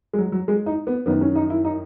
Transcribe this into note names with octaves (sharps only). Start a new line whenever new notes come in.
G#3
F#3
F#3
G#3
D#4
B3
F#2 D#3 B3
C#4
D#4
E4
D#4